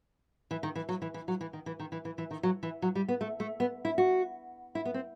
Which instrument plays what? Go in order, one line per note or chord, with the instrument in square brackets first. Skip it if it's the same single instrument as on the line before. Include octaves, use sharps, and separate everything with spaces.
[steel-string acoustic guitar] E3
D#3
E3
F#3
E3
E3
F#3
E3
D#3
E3
D#3
E3
E3
E3
D#3
F#3
E3
F#3
G3
B3
A3
A3
B3
E4
F#4
E4
B3
C4